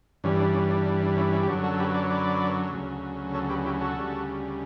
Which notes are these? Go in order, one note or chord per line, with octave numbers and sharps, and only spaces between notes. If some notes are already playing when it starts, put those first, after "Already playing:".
G2 E3 G3 C#4
D4
C#4
D4
D4
D4
C#4 E4
C#4 E4
G4
F#2 D3 F#3 D4 F#4
F#4 A4
A4
G4 B4
B4 D5
C#5
B4 D5
D2 C#3 F#3
A4 C#5
G4 B4
E4 G4
F#4 A4
D2 C#3 G3